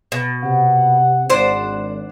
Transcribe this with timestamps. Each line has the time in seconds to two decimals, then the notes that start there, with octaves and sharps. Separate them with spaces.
0.12 B2
0.44 C3 F#5
1.30 G#1 D4 C5 F#5